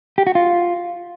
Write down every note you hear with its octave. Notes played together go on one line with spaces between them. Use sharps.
G4
F#4
F4